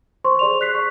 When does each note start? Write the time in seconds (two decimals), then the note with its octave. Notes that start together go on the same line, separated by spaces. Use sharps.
0.24 C5 C6 C#6
0.39 G#4 D5 F7
0.61 F#6 B6 C7
0.75 C#6